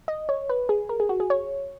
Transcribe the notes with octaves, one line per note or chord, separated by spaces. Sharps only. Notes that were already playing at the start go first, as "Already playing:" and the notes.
D#5
C#5
B4
G#4
A#4
G#4
F#4
G#4
C#5